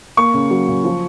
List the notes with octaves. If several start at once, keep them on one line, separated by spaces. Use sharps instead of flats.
A#3 C#6
C#3
F#3
C#3
F3